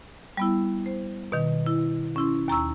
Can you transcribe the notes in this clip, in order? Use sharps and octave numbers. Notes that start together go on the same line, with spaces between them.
G3 B3 E4
C5
B2 D#3
E4
C#4 E4 C6
D#2 A#5 C#6 E6